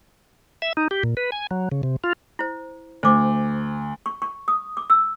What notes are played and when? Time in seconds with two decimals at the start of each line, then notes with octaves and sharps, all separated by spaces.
0.62 E5
0.77 D#4
0.91 G4
1.03 A#2
1.17 B4
1.32 G#5
1.51 F#3
1.72 C#3
1.83 C3
2.04 F4
2.39 E4 C5
3.03 D2 C5 D6
4.06 C#6
4.22 C#6
4.48 D#6
4.77 D6
4.90 E6